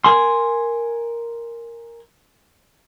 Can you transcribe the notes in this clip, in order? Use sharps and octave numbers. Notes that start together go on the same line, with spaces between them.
A#4 G#5 C6